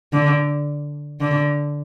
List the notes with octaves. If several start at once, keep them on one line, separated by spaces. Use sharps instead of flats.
D3
D3